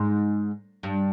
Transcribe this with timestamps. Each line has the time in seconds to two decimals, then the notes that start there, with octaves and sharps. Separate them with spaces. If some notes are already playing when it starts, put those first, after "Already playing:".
Already playing: G#2
0.83 G2